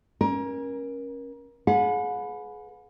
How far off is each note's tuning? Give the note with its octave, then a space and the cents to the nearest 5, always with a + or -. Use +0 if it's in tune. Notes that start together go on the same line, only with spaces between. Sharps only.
C#4 -15 A#4 +30
G#4 +30 B4 +10 F#5 -40